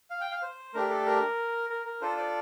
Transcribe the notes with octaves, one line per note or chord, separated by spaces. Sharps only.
F5
G5
F5
C5
A3 D4 G4 A#4
A4
A#4
A#4
A#4
D4 F4 A4 C5
D5